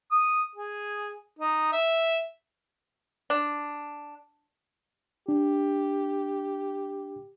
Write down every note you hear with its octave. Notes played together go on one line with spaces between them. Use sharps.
D#6
G#4
D#4
E5
D4
D4 G4